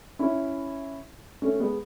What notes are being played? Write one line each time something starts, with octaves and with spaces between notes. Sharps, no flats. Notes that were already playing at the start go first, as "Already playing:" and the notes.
C#4 E4
A3 C#4
G#3 B3